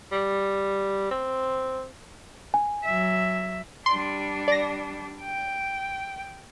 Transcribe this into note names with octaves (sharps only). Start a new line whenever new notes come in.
G3
C4
G#5
F#3 E5
G3 D4 C6
D5 A#6
G5